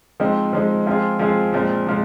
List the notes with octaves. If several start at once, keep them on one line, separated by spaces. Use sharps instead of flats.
F3 G#3 C4 D#4
F3 G#3 C4 D#4
F3 G#3 C4 F4 G#4
F3 G#3 C4 F4 G#4
A#2 F3 G#3 C4
A#2 F3 G#3